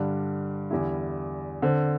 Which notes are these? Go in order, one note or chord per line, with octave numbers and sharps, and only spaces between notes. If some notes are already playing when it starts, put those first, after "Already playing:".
Already playing: G2 D3 G3 D4
E2 D3 G3 E4
D3 C4 A4